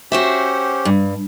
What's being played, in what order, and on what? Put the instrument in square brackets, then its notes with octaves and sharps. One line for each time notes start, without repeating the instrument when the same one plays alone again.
[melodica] C#4 G4 [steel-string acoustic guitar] F#4 C5 E5
[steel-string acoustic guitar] G2